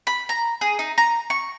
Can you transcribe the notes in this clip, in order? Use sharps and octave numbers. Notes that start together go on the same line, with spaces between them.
B5
A#5
G#4
D#4
A#5
C#6